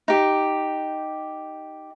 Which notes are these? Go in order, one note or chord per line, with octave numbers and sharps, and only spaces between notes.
D#4 G4